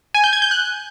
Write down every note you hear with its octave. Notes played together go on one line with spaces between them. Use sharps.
G#5
G6
G#6
G6
F#6